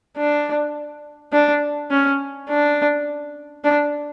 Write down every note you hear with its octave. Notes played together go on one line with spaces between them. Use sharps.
D4
D4
C#4
D4
D4